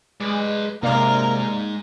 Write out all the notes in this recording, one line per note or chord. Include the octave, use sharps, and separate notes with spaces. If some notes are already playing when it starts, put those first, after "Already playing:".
G#3 B4 D5
C3 G#3 A#3 D#4 A#4 D5 F5